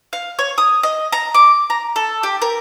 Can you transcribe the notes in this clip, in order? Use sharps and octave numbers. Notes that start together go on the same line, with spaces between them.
F5
C#5
D#6
D#5
A#5
D6
A#5
A4
G4
A#4